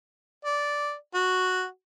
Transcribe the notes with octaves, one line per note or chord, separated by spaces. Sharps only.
D5
F#4